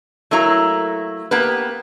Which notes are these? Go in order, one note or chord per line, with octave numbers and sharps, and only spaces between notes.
F#3 A3 A#3 E4 A#5
A#3 B3 G4 B4